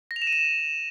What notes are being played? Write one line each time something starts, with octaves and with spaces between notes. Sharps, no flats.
A#6
F7
E7
D#7
E7